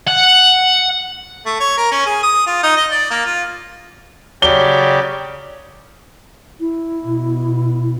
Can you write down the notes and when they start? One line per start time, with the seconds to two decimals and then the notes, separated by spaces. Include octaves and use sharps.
0.08 F#5
1.46 A3
1.60 C#5
1.77 A#4
1.91 C#4
2.06 G#4
2.23 D#6
2.46 F4
2.63 D#4
2.76 D#5
2.91 D5
3.10 A#3
3.26 F4
4.42 C#3 F#3 G4 D5 G7
6.60 E4
7.04 B2